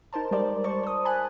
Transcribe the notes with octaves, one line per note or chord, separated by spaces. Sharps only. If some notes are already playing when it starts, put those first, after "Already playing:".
D#4 A#4 C5 A5
G3 G#3 G4 A#4 C5 D5
A#4 C5 D5 A5 C#6
C5 D#6
G#5 A5 B5 F#6